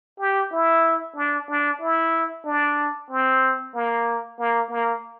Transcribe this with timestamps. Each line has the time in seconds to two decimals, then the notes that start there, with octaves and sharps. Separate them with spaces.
0.20 G4
0.52 E4
1.16 D4
1.49 D4
1.81 E4
2.46 D4
3.10 C4
3.75 A#3
4.39 A#3
4.71 A#3